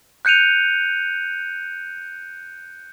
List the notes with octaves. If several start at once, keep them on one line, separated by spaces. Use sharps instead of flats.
F#6 G6 C#7 D#7 F7